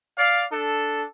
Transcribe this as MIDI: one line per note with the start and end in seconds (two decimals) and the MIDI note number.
0.19 0.44 74
0.19 0.44 77
0.52 1.05 62
0.52 1.05 69